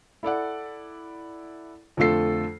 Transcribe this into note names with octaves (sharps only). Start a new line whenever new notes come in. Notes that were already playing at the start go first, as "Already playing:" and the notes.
E4 A4 D5 F#5
F2 D3 A3 F4 A4 C7